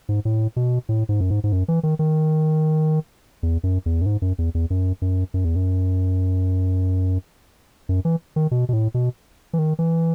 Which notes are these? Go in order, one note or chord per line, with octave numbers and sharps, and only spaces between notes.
G#2
A2
B2
A2
G#2
F#2
G#2
G#2
F#2
E3
D#3
D#3
E2
F#2
E2
F#2
G#2
F#2
E2
E2
F#2
F#2
F#2
E2
F#2
F#2
E3
D#3
B2
B2
A2
B2
E3
D#3
E3